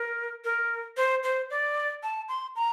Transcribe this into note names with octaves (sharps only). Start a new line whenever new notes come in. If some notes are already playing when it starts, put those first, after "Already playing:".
Already playing: A#4
A#4
C5
C5
D5
A5
C6
A#5